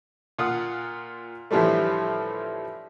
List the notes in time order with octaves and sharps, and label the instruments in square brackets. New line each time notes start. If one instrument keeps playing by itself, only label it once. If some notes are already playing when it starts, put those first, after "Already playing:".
[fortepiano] A#2 F4 F#5 D#6
A2 D3 E3 F3 G3 A3